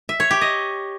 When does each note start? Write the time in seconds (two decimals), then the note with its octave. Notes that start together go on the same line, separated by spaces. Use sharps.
0.09 E5
0.20 C#5
0.31 G4
0.41 D#5